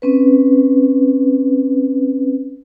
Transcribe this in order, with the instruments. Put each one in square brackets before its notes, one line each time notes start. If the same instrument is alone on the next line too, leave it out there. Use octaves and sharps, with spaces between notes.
[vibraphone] C4 C#4 B4